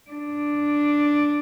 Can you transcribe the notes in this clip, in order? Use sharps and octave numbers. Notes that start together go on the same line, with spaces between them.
D4